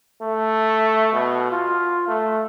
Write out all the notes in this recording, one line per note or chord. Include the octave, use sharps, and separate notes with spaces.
A3
B2
F4
A3